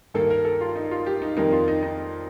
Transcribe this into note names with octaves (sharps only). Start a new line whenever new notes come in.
G2 D#3 A#3 A4
A#4
A4
F4
D#4
F4
G4
D#4
F2 D#3 G3 A#3 D#4
F4
D#4
D#4